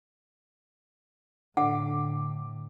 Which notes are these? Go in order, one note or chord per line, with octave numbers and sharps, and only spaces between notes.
A2 D3 F#5 D6